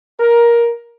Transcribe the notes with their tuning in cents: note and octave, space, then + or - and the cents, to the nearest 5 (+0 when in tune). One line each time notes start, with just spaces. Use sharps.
A#4 +15